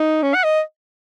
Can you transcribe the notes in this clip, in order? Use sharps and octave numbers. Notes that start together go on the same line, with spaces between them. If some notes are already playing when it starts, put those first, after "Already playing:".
Already playing: D#4
C#4
F#5
D#5